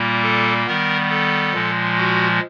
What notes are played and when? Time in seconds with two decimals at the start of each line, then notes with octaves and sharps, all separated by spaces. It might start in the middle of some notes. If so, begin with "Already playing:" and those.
Already playing: A#2 G3 A#3
0.23 A4
0.66 D#3 G3 B3 A#4
1.10 A4
1.53 A#2 F3 G#3
1.97 F#4